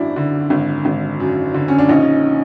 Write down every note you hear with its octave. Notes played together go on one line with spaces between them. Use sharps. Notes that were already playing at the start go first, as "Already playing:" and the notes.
Already playing: G#1 F#2 D4 E4
D3
G#1
G#1
F#2
D3
C#4
D4
A#1 C#4 D#4